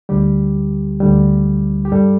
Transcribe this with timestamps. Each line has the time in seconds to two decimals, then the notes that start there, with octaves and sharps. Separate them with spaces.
0.09 D2 D3 G3 G4
1.00 D2 D3 G3
1.85 G4
1.92 G2 G3 A4